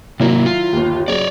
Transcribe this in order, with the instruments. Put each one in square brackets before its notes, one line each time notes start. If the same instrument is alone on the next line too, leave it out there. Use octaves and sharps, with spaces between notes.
[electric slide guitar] C3 A#3 [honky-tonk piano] D#3 F#3 E4
[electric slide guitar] F4
[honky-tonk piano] G1 D#2
[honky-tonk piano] C#3 F#3 [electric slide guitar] C#5 D5